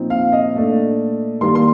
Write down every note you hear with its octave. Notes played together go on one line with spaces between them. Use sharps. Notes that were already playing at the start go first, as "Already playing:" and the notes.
Already playing: A#2 F3 C4 D#4
F5
D#5
A#2 A3 D4
D#3 G3 A#3 C6
C6